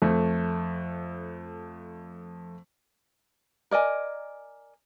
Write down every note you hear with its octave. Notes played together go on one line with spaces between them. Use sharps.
F2 A3
A#4 D5 D#5 G#5